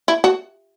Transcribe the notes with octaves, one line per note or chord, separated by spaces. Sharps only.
E4
F#4